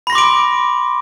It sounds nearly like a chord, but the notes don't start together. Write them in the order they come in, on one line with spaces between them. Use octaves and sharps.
B5 A#6 C6 D6 D7